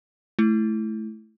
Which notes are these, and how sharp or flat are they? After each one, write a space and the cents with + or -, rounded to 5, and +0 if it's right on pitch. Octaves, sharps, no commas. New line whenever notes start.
A3 -15 E4 +10